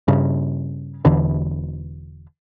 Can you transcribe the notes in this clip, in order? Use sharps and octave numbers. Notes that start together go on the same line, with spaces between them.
G2 C#3
E1 E2 D3 E3